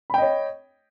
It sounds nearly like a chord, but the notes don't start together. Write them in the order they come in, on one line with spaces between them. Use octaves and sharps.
B5 G5 D#5 C#5